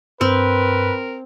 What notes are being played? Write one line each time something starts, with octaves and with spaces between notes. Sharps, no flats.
G2 C4 A#4 B4